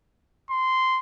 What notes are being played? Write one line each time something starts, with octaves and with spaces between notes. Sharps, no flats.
C6